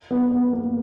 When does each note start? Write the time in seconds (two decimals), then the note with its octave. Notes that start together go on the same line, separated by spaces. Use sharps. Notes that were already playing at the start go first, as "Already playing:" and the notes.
0.11 B3
0.31 B3
0.53 A#3